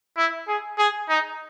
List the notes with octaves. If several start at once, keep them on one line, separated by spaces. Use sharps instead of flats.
E4
G#4
G#4
D#4